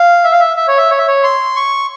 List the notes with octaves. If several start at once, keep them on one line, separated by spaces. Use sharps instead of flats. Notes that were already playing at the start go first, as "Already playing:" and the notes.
Already playing: F5
E5
F5
E5
E5
C#5
E5
C#5
E5
C#5
C6
C#6